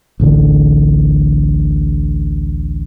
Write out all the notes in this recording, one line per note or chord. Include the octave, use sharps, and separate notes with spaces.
A1 D2 D3